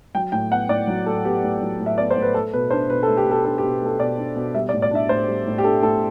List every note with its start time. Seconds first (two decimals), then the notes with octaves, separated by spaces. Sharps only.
0.15 F#3 G5
0.32 A2 G5
0.50 B3 F#5
0.69 A2 D5
0.87 F#3
1.06 A2 A4
1.25 B3 G4
1.43 A2
1.61 F#3
1.79 A2
1.86 E5
1.98 B3 D5
2.11 C5
2.16 A2
2.22 B4
2.34 A3 A4
2.53 B2 B4
2.71 D4 C5
2.89 B2 B4
3.03 A4
3.08 A3
3.17 G4
3.26 B2
3.31 A4
3.44 D4 A4
3.58 G4
3.63 B2
3.82 A3 A4
4.00 B2 D5
4.18 D4
4.36 B2
4.55 G3 E5
4.69 D5
4.73 A2
4.82 D5
4.91 D4 E5
5.09 A2 C5
5.28 G3
5.46 A2
5.58 G4
5.64 D4 A4
5.82 A2 A4